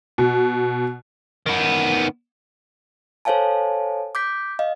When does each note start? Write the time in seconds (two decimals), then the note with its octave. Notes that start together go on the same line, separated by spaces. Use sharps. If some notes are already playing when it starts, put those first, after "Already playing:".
0.18 B2
1.46 D#3 B3
3.25 A4 C5 C#5 F5 G#5 A5
4.15 D6 G6 B6
4.59 D#5 F5